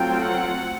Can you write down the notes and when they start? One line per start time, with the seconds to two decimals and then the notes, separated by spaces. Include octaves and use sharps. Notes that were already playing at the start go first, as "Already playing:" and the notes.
Already playing: F#3 A3 C4 F4 G5
0.23 F#5